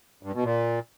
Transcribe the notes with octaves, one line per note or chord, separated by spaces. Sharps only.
G2
B2
A#2